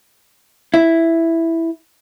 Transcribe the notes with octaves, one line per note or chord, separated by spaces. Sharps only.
E4